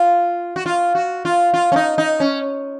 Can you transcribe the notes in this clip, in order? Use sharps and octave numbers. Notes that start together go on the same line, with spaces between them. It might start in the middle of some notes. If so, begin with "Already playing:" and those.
Already playing: F4
F#4
F4
F#4
F4
F4
C#4
D#4
D#4
C#4